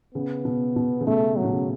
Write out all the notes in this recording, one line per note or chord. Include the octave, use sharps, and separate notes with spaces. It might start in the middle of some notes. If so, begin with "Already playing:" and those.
C#3 B3
B2
B2
C#3
B2 A3
A2 F#3
B2
C#3